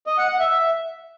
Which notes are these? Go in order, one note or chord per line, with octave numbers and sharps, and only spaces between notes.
D#5
F#5
F#5
E5